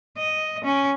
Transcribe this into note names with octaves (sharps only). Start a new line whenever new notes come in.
D#5
C#4